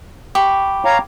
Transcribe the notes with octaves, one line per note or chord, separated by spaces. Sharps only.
G4 B5 C#6
C#5 F5 A#5